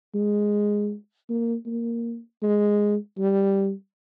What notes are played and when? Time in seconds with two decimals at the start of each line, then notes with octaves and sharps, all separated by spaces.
0.15 G#3
1.29 A#3
1.66 A#3
2.43 G#3
3.18 G3